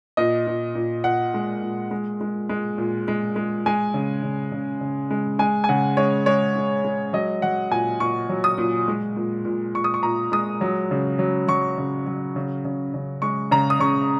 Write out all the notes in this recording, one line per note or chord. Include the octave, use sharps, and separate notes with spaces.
A#2 D#5
A#2
A#2
A#2 F#5
G#3
A#2
G#3
G#3
G#3
A#2
G#3
G#3
G#3 G#5
C#3
C#3
C#3
C#3
G#3
G#3 G#5
G#5
C#3 F#5
G#3 C#5
G#3 C#5
G#3
G#3
F#3 D#5
F#3 F#5
A#2 G#5
A#2 C#6
F#3
D#6
A#2
G#3
A#2
A#2
A#2 C#6
D#6
C#6
A#2 A#5
G#3 D#6
F#3
C#3
F#3
F#3 C#6
C#3
F#3
C#3
C#3
C#3
G#3 C#6
C#3 A#5
D#6
C#3 C#6